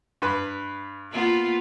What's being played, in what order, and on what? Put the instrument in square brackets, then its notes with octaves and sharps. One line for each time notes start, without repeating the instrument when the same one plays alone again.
[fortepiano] G2 B4
[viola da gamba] A#3 B3 F4